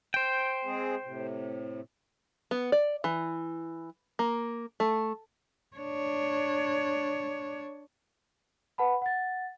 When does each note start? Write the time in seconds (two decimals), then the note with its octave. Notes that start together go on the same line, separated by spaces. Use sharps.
0.14 C5 G5
0.64 G#3 C4 G#4
1.04 A2 C3
2.51 B3
2.72 D5
3.04 E3
4.19 A#3
4.80 A3
5.77 D4 C#5
8.78 B4 F#5 A5 B5
9.02 F#5 A6